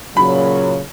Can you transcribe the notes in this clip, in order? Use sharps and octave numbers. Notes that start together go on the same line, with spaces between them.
A#2 C#3 F#3 B5